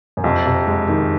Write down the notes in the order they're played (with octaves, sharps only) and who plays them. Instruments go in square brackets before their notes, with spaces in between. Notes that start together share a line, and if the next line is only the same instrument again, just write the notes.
[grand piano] F#2
[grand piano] F2 [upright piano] C3
[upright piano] C3
G#3
D#3